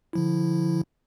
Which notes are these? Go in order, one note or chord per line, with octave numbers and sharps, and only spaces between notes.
D3 F3 E4